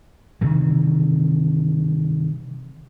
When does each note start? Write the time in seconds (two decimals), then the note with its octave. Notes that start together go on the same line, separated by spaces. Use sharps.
0.41 G2 C3 D#3 E3